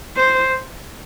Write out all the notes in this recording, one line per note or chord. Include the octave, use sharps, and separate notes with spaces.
C5